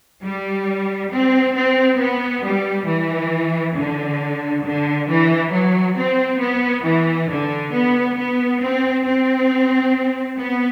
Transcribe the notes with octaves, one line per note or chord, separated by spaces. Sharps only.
G3
C4
C4
B3
G3
E3
D3
D3
E3
F#3
C4
B3
E3
D3
B3
B3
C4
C4
B3